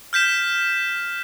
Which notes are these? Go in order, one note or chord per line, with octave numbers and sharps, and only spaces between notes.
F6 G6 B6 E7